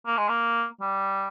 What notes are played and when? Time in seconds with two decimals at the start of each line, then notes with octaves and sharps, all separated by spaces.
0.06 A#3
0.17 G#3
0.29 A#3
0.81 G3